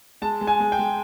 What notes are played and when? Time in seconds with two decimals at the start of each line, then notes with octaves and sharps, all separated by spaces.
0.22 G#3 A5
0.41 G#3
0.47 G#5
0.60 G#3
0.72 G5
0.79 G#3